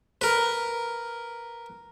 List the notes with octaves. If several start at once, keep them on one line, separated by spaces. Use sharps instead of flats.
A#4 B4